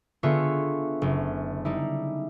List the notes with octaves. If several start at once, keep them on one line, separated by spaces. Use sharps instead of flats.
D3 B3 F4 G#4 E5 C#6
F#1
G3 D#4 E4